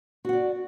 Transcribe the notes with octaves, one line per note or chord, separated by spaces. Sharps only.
F#4 D5 F#5